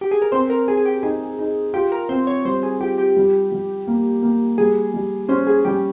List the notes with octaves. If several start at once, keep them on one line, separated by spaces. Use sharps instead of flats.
G4
G#4
A#4
C4 C5
A#4
G#4 A#4
G#4
G4
D#4 G#4
D#4
F4 G4
A#4
C4 C5
C#5
G3 C5
G#4
F4 G4
G4
G3
G3
A#3
A#3
G3 G#4
G3
C#4 C5
G#4
G3 G4